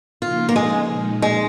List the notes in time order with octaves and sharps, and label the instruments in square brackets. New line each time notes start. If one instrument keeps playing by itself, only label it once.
[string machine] C#3 F3 A#3 D#4 [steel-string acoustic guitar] F4
[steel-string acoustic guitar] A#3
G#3
[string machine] A#2 F3 G#3 D#4
[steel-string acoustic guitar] G#3